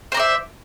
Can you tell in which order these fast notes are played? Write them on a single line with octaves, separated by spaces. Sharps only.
C5 A#5 D5 E5